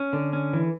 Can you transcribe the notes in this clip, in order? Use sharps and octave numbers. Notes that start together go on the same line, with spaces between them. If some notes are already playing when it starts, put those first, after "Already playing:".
Already playing: C#4
D3
C#4
E3